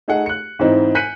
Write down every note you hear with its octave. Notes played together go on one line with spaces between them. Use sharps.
A3 D#4 G#4 A4 F#5
F#6 C#7
G#2 E3 C4 D#4 E4
G#5 F#6 G6 B6 C#7 D#7